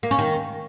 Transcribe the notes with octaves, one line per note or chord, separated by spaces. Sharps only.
A#3
C#4
D#3